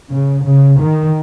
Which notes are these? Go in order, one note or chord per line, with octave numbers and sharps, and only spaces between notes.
C#3
C#3
D#3